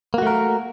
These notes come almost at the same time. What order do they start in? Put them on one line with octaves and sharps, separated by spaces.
A#3 F#4 A3 A#4